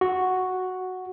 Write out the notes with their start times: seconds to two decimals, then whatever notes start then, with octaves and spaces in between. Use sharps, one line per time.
0.01 F#4